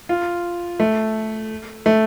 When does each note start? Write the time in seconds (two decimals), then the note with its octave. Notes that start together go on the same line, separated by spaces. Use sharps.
0.09 F4
0.80 A3
1.86 A3